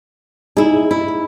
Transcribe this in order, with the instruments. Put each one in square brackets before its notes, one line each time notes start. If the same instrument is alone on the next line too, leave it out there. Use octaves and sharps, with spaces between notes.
[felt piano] D#4 [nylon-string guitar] E4 G#4
[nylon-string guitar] E4